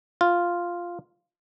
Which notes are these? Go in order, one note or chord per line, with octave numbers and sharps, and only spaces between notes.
F4